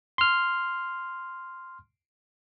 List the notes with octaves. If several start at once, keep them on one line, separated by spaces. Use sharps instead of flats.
C6 F6